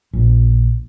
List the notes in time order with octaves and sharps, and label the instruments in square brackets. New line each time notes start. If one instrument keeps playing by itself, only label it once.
[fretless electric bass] A#1